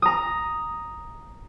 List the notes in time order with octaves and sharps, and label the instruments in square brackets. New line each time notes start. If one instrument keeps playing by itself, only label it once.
[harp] A#5 D#6